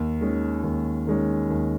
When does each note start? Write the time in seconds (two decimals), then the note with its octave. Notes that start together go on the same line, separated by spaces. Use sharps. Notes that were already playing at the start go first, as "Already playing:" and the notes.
Already playing: D#2
0.21 D#3 G#3 C#4
0.64 D#2
1.07 D#3 G#3 C#4
1.50 D#2